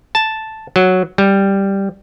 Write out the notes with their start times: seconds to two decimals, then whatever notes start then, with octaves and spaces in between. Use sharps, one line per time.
0.15 A5
0.76 F#3
1.18 G3